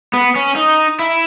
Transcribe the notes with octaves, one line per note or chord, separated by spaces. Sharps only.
B3
C#4
D#4
E4